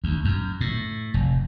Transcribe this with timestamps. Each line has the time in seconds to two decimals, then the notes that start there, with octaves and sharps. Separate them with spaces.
0.04 D2
0.25 F#2
0.61 A2
1.14 F1